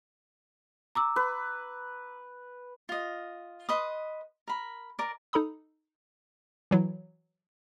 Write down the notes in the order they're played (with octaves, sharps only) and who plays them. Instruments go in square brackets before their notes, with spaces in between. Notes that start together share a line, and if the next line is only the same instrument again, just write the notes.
[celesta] A#5 D6 E6
[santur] B4
[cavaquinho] F4 D#5
B4 D#5 C6 D#6
A#4 B5
A#4 D5
[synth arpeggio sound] D#4 A4 A#5 B5 D#6
E3 F#3 E4